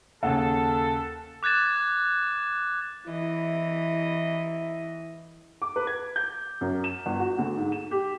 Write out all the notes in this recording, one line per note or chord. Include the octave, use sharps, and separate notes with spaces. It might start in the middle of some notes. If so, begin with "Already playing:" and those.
D#2 C#3 A4 F#5
D6 F#6 G#6 A6 E7
E3 E4 D#5
D6
B4
G#6
G6
F#2
E7
G1
F#4
D2
G#2
E7
G4